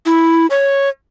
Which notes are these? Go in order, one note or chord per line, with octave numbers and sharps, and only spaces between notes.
E4
C#5